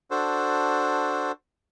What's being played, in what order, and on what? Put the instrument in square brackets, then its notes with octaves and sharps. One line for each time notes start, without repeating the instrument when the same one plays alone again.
[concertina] D4 F#4 A4 C5